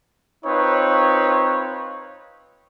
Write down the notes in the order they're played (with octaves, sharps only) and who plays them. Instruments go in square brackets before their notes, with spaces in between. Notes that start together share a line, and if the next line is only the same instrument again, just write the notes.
[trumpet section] C4 D#4 F4 B4 C#5